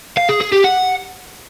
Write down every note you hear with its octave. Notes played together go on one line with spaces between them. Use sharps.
F5
G#4
G#4
G4
F#5